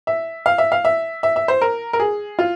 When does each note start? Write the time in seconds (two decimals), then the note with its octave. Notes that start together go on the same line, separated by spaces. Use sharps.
0.07 E5
0.46 F5
0.58 E5
0.72 F5
0.85 E5
1.23 E5
1.36 E5
1.48 C5
1.61 A#4
1.93 A#4
2.00 G#4
2.39 F4